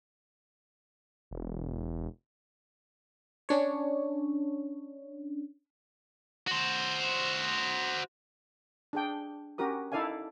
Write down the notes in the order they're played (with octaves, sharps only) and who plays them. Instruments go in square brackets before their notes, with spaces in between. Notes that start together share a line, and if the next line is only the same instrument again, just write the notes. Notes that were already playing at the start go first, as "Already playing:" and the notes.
[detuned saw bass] E1
[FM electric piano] C#4 D4 C#5
[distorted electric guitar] F#4 C5
[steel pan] D4 G#4 G5
C#4 F#4 G4 A#4 D#6
D#4 E4 A4 D5 F5 G#5